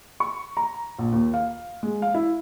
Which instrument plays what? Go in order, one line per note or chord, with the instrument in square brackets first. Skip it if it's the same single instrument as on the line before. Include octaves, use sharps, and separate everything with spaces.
[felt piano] C#6
A#5
A#1
D#2
F5
G#3
F5
E4